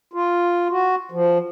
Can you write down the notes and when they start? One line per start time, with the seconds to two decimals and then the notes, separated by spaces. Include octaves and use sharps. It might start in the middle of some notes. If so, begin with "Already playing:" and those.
0.13 F4
0.70 F#4
1.12 F3